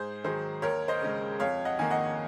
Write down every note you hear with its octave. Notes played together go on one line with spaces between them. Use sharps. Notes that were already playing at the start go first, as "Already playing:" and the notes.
Already playing: G#2 G#4 C5
D#3 F#3 G#4 C5
D#2 A#4 C#5
C5 D#5
C#3 G#3
F2 C#5 F5
D#5 F#5
D#3 A#3 G#5
D#5 F#5